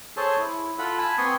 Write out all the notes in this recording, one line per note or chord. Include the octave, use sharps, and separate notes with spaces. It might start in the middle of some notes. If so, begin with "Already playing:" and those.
G#4 A4 C5 C#5 A5
E4
F4 A4 F#5 B5
G#5 A5 B5
B3 C4 G#5 C6 C#6 D#6